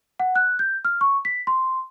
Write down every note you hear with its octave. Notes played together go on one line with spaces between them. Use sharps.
F#5
F#6
G6
F6
C#6
B6
C6